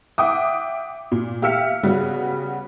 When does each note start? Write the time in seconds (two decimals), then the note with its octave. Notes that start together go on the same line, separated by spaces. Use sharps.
0.18 E5 F#5 G5 D6 D#6
1.12 A#2
1.42 G4 E5 F5 E6 F6 C#7
1.83 C#3 G3 B3 F#4